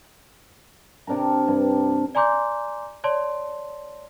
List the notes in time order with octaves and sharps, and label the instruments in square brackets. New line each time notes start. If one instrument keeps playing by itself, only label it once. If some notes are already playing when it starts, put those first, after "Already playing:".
[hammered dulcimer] C3 D4 A#4 A#5
G2
[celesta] D5 G#5 A#5 C6 D6 G6
C#5 D5 A5 C6